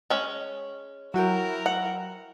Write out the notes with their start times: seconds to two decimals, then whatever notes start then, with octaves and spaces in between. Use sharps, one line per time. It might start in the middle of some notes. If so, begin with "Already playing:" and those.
0.10 G#3 C#4
1.14 F#3 E4 F#4 A#4 G5
1.66 F#5